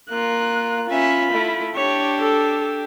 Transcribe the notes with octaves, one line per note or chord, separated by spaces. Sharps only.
A#3 F4 F#6
C#4 F4 E5 B5
A3 E4
D4 G4 C#5
A4